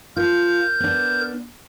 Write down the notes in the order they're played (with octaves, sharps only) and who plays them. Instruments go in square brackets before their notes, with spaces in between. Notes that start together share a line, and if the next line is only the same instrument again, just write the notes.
[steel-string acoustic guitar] F4 [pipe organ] A#4 G6
[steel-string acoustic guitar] B3 D4